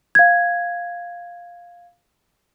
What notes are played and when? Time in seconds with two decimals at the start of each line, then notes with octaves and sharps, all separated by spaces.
0.15 F5 G#6